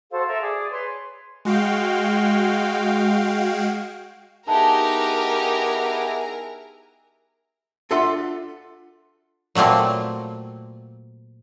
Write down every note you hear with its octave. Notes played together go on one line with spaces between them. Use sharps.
F#4 A4 C5 F5
A4 A#4 E5
G#4 D5
B4 C#5 C6
G#3 F#4 F5 G5
B3 D#4 E4 G4 G#4 A#4 A5 A#5
D4 F4 A4 E5 F#5 C6
A#2 F#3 A3 A#3 C4